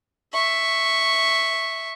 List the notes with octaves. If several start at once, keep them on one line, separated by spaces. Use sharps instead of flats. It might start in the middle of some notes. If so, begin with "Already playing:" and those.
E5 C#6